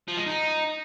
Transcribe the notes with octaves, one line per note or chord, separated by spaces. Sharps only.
F3
G#3
D#4